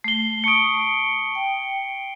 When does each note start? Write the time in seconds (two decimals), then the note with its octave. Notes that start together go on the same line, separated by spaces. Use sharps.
0.04 A3 C7 G7
0.44 A5 C#6 D#6 C#7 D7
1.35 G5